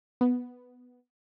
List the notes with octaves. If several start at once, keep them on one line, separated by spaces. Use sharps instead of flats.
B3